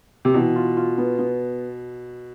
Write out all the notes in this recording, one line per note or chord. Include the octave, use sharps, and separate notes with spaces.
C3
B2 E3
F4
F4
B3
B3